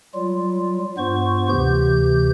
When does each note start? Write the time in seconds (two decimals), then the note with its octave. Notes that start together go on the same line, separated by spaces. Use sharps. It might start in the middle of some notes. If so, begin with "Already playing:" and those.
0.14 F#3 G3 F4
0.98 G2 B3 F4 C5 C#6
1.49 D2 C3 E3 G4 G6